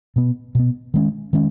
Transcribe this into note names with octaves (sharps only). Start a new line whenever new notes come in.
B2 B3
B2 B3
D#3 G#3 C#4
D#3 G#3 C#4